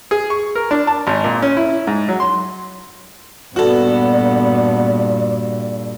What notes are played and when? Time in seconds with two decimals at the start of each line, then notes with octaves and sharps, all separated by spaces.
0.11 G#4
0.30 C#6
0.55 A#4
0.71 D4
0.87 A5
1.07 G#1
1.24 A#2
1.42 C#4
1.57 E4
1.87 G#2
2.08 F#3
2.20 C6
3.56 G2 A#2 B3 F#4 A4 D5